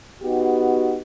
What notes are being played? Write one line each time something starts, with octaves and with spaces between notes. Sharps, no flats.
B3 D#4 F#4 G4